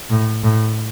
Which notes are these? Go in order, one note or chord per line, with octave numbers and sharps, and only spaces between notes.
A2
A2